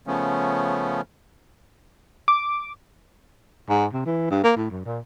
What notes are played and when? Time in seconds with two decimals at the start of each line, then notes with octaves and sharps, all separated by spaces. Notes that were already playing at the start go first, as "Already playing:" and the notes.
0.07 C#3 F3 A3 B3 C#4
2.28 D6
3.70 G#2
3.93 C3
4.06 E3
4.31 G2
4.44 A#3
4.56 A2
4.71 F#2
4.85 A#2